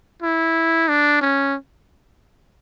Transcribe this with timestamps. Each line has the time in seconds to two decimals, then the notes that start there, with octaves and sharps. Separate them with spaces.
0.22 E4
0.88 D4
1.21 C#4